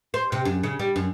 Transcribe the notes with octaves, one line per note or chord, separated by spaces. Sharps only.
C5
C3
F#2
C#3
G3
F#2